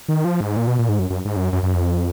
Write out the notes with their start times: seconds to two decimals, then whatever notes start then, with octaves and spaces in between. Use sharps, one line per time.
0.08 D#3
0.25 F3
0.41 G#2
0.57 A#2
0.67 B2
0.79 A#2
0.89 G#2
0.99 F#2
1.10 F#2
1.25 G#2
1.36 F#2
1.53 F#2
1.63 F#2
1.74 F2